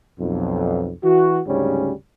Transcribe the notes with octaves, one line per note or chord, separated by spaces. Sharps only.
B1 F2
E3 F#4
D2 G#2 C#3 G3 C#4